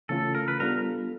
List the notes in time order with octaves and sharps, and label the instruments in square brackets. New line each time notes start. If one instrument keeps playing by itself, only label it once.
[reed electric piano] C#3 E3 A3 C#4 F4 [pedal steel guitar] A4
[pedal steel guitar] A#4
B4
[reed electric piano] G3 B3 D4 F4 A4 [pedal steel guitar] A#4